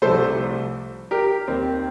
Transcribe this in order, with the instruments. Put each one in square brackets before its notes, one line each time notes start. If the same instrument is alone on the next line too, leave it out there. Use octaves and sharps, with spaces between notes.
[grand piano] C2 C3 F3 A3 A4 C5
G4 A#4
D#2 D#3 A#3 C4